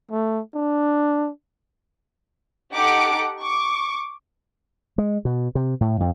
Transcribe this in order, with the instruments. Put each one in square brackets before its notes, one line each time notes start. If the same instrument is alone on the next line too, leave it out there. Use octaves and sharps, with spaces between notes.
[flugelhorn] A3
D4
[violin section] D#4 G4 A4 F#5 D6 D7
C#6 D6
[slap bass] G#3
B2
C3
A2
F2